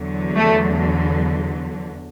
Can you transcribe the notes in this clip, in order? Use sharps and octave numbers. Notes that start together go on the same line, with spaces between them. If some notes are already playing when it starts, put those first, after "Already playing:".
Already playing: E2 D3 F#3
A3